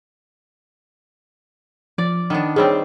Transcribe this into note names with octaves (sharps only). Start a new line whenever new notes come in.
F3 D5
D#3 B3 D4
D#3 G3 C4 G#4 C#5